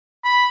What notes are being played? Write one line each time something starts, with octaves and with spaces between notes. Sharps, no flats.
B5